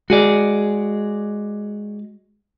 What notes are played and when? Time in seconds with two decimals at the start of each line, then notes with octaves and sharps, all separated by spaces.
0.10 G#3 F#4 G#4 D5